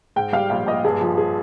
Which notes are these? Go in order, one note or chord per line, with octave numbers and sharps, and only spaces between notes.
G#2 G5
G3 F5
A#1 F5
A#1 D#5
G2 G#4
F3
G#4